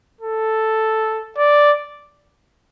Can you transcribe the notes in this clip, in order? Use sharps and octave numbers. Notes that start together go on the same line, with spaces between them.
A4
D5